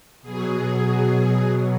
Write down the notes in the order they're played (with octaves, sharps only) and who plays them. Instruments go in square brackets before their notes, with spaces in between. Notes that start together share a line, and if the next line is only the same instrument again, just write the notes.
[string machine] B2 F#3 G#4
B2 F#3